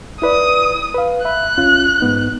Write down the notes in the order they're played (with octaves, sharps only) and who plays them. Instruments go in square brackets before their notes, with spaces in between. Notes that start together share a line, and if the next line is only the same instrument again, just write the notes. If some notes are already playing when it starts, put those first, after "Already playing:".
[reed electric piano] E4 B4 D5 [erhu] D#6
[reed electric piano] B4 F5
[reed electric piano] E5 B5 [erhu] F#6
[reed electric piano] C2 C#4 F4
G#2 B3 D#4